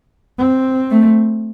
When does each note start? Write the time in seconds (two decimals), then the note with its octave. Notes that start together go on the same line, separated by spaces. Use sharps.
0.39 C4
0.90 A3